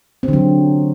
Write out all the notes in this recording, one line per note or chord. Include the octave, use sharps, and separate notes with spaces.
C4
D3
F#3